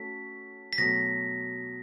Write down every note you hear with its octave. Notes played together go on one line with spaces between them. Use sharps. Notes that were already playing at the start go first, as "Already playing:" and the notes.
Already playing: A3 C#4 F#4 A4 B6
B6
B2 F#3 A3 A#6